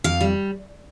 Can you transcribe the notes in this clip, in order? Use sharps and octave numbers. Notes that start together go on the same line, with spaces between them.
F2 F5
G3